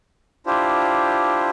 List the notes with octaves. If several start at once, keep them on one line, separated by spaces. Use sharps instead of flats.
D4 E4 F4 G4 C5